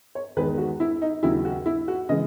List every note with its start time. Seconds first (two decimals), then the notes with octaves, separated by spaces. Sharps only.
0.15 C#5
0.36 E2 D#3 G#3 B4
0.58 F#4
0.80 E4
1.02 D#4
1.23 D#2 C#3 F#3 E4
1.45 F#4
1.66 E4
1.88 F#4
2.09 C#3 E3 G#3 D#5